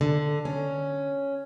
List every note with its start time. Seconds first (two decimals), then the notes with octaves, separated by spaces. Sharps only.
0.01 D3
0.45 C#4